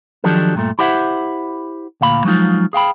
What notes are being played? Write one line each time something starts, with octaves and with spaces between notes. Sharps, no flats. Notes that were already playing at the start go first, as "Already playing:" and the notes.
D#3 F3 F#3 D4 G4 A4
G2 A#2 A3
E4 G4 C5 E5 F#5
D2 A#2 F5 B5
F3 F#3 G#3 D#4 F4
G#4 F5 G5 B5